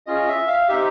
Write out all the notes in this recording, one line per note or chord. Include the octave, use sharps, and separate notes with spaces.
C#4 F4 G#4 D#5
E5
F5
C4 D#4 G4 E5